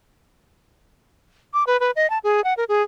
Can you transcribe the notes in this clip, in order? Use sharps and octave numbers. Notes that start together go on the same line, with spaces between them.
D6
B4
B4
D#5
A5
G#4
F#5
A#4
G#4